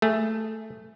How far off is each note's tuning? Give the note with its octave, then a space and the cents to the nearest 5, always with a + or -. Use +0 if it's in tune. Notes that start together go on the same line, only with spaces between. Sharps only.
A3 +0 G#4 +0